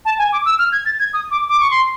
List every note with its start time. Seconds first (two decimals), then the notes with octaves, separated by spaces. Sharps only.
0.05 A5
0.19 G#5
0.32 D6
0.45 E6
0.59 F6
0.72 G#6
0.86 A6
0.99 G#6
1.14 D#6
1.31 D6
1.49 D6
1.60 C#6
1.71 C6